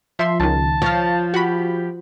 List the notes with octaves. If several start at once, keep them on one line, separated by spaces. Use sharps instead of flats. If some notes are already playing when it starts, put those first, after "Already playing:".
F3 E5 C6
C#2 D#3 A5
F3 C#5 F5
F#4 G4 B5